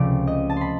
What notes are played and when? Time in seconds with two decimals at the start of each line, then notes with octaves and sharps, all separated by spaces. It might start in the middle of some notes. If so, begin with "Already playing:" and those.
Already playing: C#2 C3 F3 A3 C#4 D5
0.27 D#5
0.49 A5
0.57 B5 C6